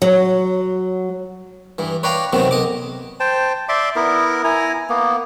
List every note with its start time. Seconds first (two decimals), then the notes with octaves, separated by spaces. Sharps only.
0.02 F#3
1.78 G2 E3
2.03 B4 C#5 D5 F5 G5 A#5
2.33 C3 D#3 F#3 B3 C4
2.51 B1 D#5 D6
3.20 C5 G5 A5
3.69 D5 E5 C6 D6
3.96 B3 E4 A#4
4.44 E4 G#5 A#5
4.89 A#3 B3